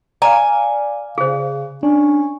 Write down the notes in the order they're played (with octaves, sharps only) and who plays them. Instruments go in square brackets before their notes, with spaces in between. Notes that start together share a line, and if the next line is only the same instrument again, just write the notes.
[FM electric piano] D5 F5 [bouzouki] G#5 [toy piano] A#5
[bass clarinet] C#3 [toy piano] G#4 C5
[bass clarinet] C#4 [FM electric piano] D4